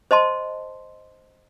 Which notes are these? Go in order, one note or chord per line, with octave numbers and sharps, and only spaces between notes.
C5 D#5 A5 C6